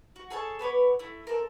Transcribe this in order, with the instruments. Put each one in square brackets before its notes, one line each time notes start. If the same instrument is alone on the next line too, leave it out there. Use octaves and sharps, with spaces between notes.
[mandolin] F#4
G#4 A4 C#5 A5
B3 B4 C#5 D6
A3 E4
C4 A4 A#4